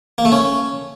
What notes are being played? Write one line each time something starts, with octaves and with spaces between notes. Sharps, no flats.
A#3
A3
C#4